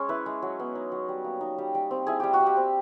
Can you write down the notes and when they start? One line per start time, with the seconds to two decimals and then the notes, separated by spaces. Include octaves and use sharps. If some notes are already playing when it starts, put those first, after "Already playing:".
Already playing: G#3 C#4 C#5
0.09 E4 B4
0.26 G#3
0.42 F#3
0.60 B3
0.75 D#4
0.92 F#3
1.09 G3
1.24 A#3
1.41 D#4
1.58 G3
1.75 G3
1.91 C4
2.07 E4 G#4
2.20 G3 G4
2.33 F#4
2.40 G3
2.46 G4
2.57 C4